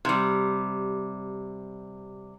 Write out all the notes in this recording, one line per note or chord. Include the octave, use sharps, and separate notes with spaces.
C3 G3